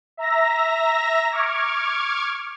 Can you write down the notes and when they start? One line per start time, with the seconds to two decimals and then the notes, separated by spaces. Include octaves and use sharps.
0.17 E5 A#5 A#6
1.32 C#6 D6 F6 G#6